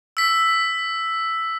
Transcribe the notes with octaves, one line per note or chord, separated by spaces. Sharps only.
E6 B6